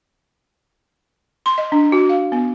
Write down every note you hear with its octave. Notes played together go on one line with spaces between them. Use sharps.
C6
D#5
D4
F#4
F5
B3